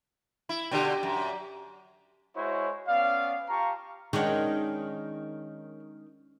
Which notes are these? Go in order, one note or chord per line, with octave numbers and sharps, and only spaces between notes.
E4 B5
B2 D3 G4 D5 G5
F#2
G#3 E4 F#4 C5 C#5
B3 C#4 D5 F5
F4 G4 F5 A5 A#5 C#6
D#3 G#3 C#4 D4 C#5 F#5 G5